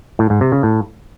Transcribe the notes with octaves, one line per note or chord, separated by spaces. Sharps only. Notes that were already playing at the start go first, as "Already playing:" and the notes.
A2
G#2
C3
C#3
A2